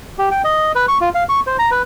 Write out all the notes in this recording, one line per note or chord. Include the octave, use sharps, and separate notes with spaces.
G4
G5
D#5
B4
C#6
F4
F5
C#6
C5
A#5
B4